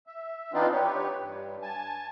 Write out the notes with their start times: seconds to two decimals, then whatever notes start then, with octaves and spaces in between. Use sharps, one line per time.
0.07 E5
0.53 E3 B3 C4 D4 D#4 F4
0.73 G4 B4 C#5
1.18 G2
1.62 G#5 A5